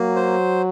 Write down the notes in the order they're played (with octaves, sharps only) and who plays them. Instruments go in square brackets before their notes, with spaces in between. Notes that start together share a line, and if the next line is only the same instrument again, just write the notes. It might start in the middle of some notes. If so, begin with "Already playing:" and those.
Already playing: [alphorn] F#3 [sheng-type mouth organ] A#3
[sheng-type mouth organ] C5